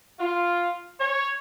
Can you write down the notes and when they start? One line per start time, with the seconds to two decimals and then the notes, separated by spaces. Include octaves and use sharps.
0.19 F4
0.99 C#5